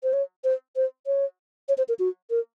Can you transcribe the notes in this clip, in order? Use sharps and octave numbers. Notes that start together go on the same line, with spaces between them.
C5
C#5
C5
C5
C#5
C#5
C5
A#4
F#4
A#4